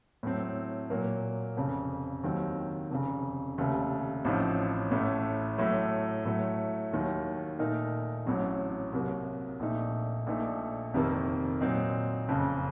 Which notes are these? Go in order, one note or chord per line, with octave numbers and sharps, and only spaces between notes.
A2 F#3 A3 C4
A#2 F#3 A#3
F1 F2 C#3
D#2 D#3 F#3 C4
F1 F2 C#3
F1 D#2 C#3 A3
A1 A2 F3 C4 D#4
A1 A2 A3
A2 F#3 A3
A2 F#3 A3
D#2 D#3 F#3
A#2 A3 D#4 A#4
A1 A2 F#3 C4
C2 C3 F#3 A#3
A#1 A#2 A3 D#4
A#1 A#2 A3 D#4
F1 F2 C3 D#3 A#3
A#2 F#3 C4 D#4
F#1 F2 C#3